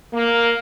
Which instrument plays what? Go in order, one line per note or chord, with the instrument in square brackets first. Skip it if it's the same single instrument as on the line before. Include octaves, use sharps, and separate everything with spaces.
[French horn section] A#3